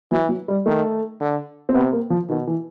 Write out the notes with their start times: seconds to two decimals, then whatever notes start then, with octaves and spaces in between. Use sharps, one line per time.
0.11 E3 F#3
0.29 F#3
0.48 G3
0.66 D#3 A3
1.20 D3
1.69 C4
1.74 C3 B3
1.93 A#3
2.10 F3
2.29 B2 D#3
2.47 E3